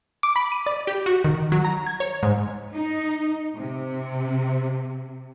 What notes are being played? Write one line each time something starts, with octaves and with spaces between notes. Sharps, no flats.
D6
B5
D#7
D5
G4
F#4
D#3
F#3
A#5
G#6
C#5
G#2
D#4
C3